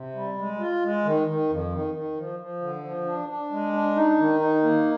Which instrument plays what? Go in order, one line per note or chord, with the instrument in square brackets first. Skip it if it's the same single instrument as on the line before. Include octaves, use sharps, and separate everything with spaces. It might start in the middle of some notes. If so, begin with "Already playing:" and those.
Already playing: [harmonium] C3
G3
G#3
F4
G#3
D#3
D#3
F2
D#3
D#3
F3
F3
D3
F3
D4
D4
G#3
D4
D#4
D#3
D#4
A#3